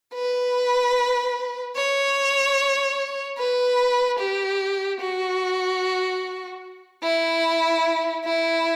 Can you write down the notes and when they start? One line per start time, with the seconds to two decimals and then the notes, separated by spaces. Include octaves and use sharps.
0.14 B4
1.76 C#5
3.38 B4
4.19 G4
5.01 F#4
7.03 E4
8.24 E4